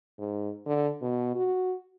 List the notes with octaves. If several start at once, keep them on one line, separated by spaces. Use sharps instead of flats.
G#2
D3
B2
F#4